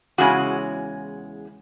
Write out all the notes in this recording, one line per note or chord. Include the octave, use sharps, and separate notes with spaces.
E2 C#3 G#3 C#4 F#4